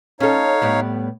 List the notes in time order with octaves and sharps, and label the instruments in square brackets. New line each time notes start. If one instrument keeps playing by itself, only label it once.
[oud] C#4 A4 [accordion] D#4 C#5 F5
[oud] A2 G3 B3